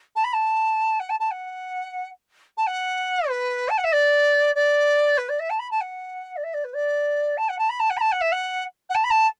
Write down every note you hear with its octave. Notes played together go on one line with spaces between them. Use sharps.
A5
B5
A5
F#5
A5
A5
F#5
A5
F#5
B4
A5
F#5
E5
D5
D5
B4
D5
E5
A5
B5
A5
F#5
D5
E5
D5
B4
D5
A5
F#5
A5
B5
A5
F#5
B5
A5
F#5
E5
F#5
F#5
A5
B5
A5